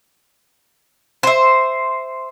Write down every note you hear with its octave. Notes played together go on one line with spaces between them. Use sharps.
C5 E5